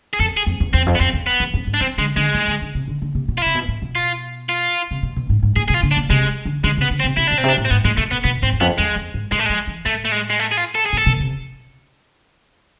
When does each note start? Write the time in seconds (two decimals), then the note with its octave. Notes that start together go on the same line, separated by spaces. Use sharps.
0.13 G#4
0.19 F2 A4
0.37 G#4
0.46 F2
0.60 E2
0.73 E2 C4
0.86 F2
0.95 B3
1.00 F2 C4
1.14 E2
1.27 B3
1.40 E2
1.54 F2
1.67 G#2
1.74 D4
1.80 F3 C4
1.98 D3 G#3
2.16 D3 G#3
2.34 E3
2.48 D3
2.61 D3
2.75 C3
2.88 D3
3.02 D3
3.15 C3
3.28 B2
3.38 F4
3.42 C3 E4
3.55 B2
3.68 A2
3.82 B2
3.95 F4
4.49 F4
4.91 C3
5.03 B2
5.16 B2
5.29 G#2
5.43 G#2
5.56 A2 G#4
5.68 B2 G#4
5.74 F4
5.83 D3
5.91 D4
5.97 B2
6.10 C3 G#3
6.45 D3
6.64 D3 G#3
6.77 C3 B3
6.91 D3
7.00 C4
7.04 C3
7.17 C3 E4
7.27 B2 D4
7.38 C4
7.44 C3
7.48 D4
7.57 A2
7.65 C4
7.70 G#2 B3
7.85 A2 G#3
7.97 B2 A3
8.11 B2 B3
8.24 B2 B3
8.42 G#2 C4
8.52 E2
8.60 F2 B3
8.78 E2 G#3
8.96 F2
9.14 G#2
9.32 A2 G#3
9.39 A3
9.46 F3 G#3
9.67 E3
9.85 A2 A3
10.05 A3
10.12 G#3
10.30 G#3
10.39 A3
10.52 G#4
10.57 F4
10.75 A4
10.86 G#4
10.93 A2 A4
11.06 B2
11.20 C3